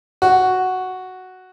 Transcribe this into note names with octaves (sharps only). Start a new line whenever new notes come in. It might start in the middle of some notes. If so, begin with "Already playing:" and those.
F#4